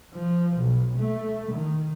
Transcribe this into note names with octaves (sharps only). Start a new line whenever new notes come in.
F3
B1
A3
D#3